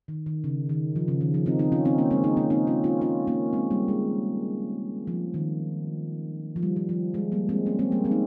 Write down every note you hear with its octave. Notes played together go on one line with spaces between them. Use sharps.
D#3
D#3
C#3
D#3
F3
C#3
D#3
F3
C4 D#4
C4 D#4
C#4 F4
C4 D#4
A#3 C#4
G#3 C4
C4 D#4
A#3 C#4
C4 D#4
C#4 F4
C#4 F4
C#4 F4
A#3 C#4
G#3 C4
G3 A#3
G#3
F3
D#3
F3
G3
F3
F3
G#3
G3 A#3
G#3 C4
A#3 C#4
G#3 C4
G3 A#3
G#3 C4
D#4